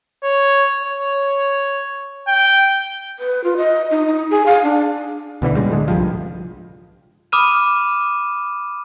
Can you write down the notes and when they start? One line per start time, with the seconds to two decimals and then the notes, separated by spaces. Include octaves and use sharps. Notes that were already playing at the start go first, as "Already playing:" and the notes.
0.23 C#5
0.83 C#5
2.28 G5
3.19 B4
3.44 F4
3.57 D#5
3.91 D#4
4.07 D#4
4.31 G#4
4.46 F5
4.64 D4
5.42 D2 B2 D3 E3
5.56 A#2 C#3 G3 G#3
5.70 A2 D3 G#3
5.88 C2 G2 F3
7.32 B5 D6 D#6 F6 D#7 E7